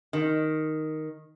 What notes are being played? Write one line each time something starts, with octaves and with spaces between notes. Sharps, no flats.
D#3